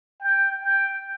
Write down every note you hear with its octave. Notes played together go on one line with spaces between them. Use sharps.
G5
G5